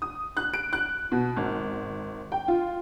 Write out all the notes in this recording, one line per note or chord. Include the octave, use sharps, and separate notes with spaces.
D#6
F#6
D7
F#6
B2
G#1
G5
F4